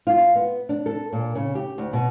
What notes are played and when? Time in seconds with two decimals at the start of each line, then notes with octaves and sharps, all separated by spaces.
0.07 F4
0.35 B3
0.69 D4
0.86 A4
1.12 A#2
1.35 C#3
1.55 G4
1.78 D2
1.93 B2